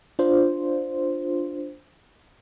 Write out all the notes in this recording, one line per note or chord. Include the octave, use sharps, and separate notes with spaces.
D4 F4 C5